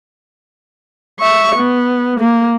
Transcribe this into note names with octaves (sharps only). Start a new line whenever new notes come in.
E5 C#6
B3
A#3